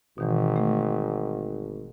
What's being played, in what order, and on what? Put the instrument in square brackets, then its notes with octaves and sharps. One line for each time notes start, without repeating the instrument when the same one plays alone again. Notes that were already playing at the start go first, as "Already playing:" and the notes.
[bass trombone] G#1 [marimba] B2 D#3 E3
[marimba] A3